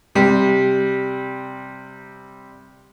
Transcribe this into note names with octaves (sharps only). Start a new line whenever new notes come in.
C3 G3